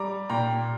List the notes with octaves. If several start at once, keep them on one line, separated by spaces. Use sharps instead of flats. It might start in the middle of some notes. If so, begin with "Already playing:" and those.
Already playing: G3 A#5 D6
A#2 G5 A#5